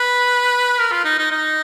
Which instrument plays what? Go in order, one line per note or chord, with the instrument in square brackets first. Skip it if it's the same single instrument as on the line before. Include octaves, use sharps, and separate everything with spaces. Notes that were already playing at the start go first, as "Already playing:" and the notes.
Already playing: [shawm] B4
A#4
F4
D#4
D#4
D#4